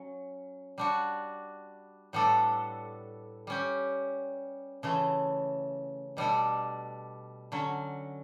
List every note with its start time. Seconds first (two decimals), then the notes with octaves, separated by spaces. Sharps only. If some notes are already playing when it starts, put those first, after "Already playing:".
Already playing: F#3 C#4
0.78 G3 D4 F#4
2.13 A2 G3 B3 D4 A4
3.47 G3 C#4 G4
4.83 C#3 E3 A3
6.17 B2 G3 D4 A4
7.52 D3 F#3 C#4